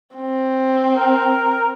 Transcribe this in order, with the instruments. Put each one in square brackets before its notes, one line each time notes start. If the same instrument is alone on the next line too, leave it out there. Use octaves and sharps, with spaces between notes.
[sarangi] C4
[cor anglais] A#4